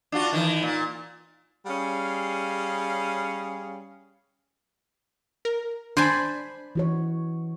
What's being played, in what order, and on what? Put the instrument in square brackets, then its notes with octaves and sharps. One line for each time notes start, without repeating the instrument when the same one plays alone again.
[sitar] D4 F4 F#4
D#3 E3
A#2
[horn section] G3 C#4 G#4 F5
[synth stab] A#4
[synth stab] D4 B5 [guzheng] C5 G#5 A5
[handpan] E3 F#4 C#5